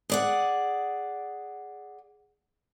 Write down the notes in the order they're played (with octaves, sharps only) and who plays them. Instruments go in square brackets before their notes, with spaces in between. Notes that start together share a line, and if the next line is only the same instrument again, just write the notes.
[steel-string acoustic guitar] G#4 D5 F#5